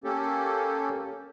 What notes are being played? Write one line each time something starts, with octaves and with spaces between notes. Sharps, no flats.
A#3 C#4 G4 A4